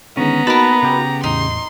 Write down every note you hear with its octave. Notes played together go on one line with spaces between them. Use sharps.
D3 D#3 G#3 B3 C#4 A#5
A#3 D#4 F#4 A#4 B4 A5
C#3 G4
E2 A2 D#4 C6